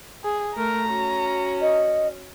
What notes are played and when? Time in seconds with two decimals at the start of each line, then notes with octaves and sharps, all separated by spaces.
0.24 G#4
0.56 A3 A#4 A#5
0.89 C#4 F#4
1.61 D#5